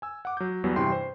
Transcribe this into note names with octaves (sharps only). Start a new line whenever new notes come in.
G#5 E6
F#5 D6
F#3 G6
E2 F#3 G3 B3
G2 C3 E3 G5 C6 C7
C5